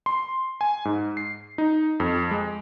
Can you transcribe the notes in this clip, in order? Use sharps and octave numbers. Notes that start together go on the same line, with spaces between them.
C6
G#5
G#2
C7
D#4
F2
G#3